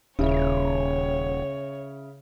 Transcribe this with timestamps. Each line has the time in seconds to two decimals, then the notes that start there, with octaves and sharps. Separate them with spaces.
0.19 D#1 C#3 E4 C#5